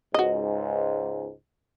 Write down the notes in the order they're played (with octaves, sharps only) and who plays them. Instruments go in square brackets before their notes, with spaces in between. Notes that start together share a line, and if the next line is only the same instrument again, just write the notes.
[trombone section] C#2 G#2 [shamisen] F#4 D#5